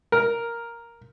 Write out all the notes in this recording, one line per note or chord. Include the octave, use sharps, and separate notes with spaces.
A#4